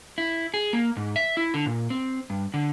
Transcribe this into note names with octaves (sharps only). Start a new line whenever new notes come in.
E4
G#4
A#3
G#2
E5
E4
D3
A#2
C4
G2
D3